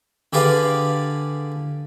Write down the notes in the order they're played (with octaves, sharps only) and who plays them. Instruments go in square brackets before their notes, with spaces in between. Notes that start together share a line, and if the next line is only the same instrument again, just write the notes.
[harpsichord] D3 G4 G#4 B4 D5 F5